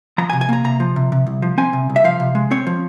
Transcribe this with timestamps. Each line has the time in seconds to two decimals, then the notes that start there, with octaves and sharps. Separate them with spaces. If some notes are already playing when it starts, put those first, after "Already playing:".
0.18 F3 A#5
0.30 G#5
0.33 C3
0.41 G#5
0.49 A#3 A#5
0.64 C3 A#5
0.80 F3
0.96 C3
1.12 C3
1.27 C2
1.42 F3
1.58 C4 G#5
1.73 C3
1.90 C2
1.96 E5
2.04 F3 F5
2.20 C3
2.35 G#3
2.51 C4 C#5
2.67 F3